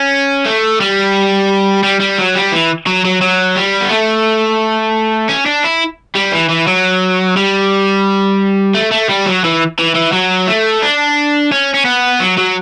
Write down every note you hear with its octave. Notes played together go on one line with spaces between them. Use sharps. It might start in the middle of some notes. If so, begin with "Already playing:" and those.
Already playing: C#4
A3
G3
G3
G3
F#3
G3
E3
F#3
F#3
F#3
G3
B3
A3
C#4
D4
E4
G3
E3
E3
F#3
G3
A3
A3
G3
F#3
E3
E3
E3
F#3
A3
D4
C#4
C#4
B3
F#3
F#3